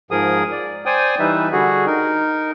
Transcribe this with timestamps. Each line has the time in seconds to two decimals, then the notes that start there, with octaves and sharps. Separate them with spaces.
0.11 G#2 F3 G#4 A#4 D#6
0.51 D5
0.86 C5 D5 G5 G#5 D#6
1.19 E3 G3 D#4 B4 E5
1.52 D3 G3 F#4 G#4
1.86 D#4 A#4